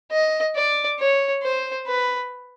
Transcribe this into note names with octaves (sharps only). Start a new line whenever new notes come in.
D#5
D5
C#5
C5
B4